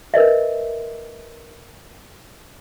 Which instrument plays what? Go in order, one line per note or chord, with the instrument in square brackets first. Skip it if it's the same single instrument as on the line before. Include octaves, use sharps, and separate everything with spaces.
[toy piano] A#4 B4 D#5 E5